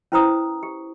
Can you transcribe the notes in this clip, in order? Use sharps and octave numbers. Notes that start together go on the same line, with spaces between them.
C#4 E4 B4 C5 A#5 D#6
G4